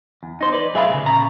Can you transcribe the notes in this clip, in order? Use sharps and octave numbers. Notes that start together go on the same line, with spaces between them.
E2
D#4 C5
B4 D5
F#2 A3 G#4 E5 F5 B5
D2 C#3
A#2 C#3 A#5